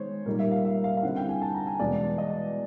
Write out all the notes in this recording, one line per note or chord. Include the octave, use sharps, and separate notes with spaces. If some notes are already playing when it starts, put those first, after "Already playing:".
Already playing: D#3 G#3 B3 C5 C#5
A#2 G3 A#3 D#4 A#4
E5
F5
E5
F5
F5
D3 G3 C4 E4 F#5
G5
G#5
A5
A#5
G#5
E2 B2 G#3 D5
D#5